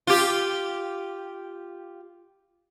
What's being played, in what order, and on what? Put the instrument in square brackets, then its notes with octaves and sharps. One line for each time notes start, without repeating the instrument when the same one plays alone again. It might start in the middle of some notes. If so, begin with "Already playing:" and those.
[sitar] F4 G4